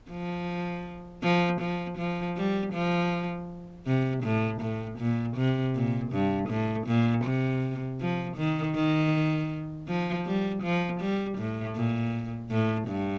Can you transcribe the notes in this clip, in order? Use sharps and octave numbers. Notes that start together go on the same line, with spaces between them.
F3
F3
F3
F3
G3
F3
C3
A2
A2
A#2
C3
A#2
G2
A2
A#2
C3
F3
D#3
D#3
F3
G3
F3
G3
A2
A#2
A2
G2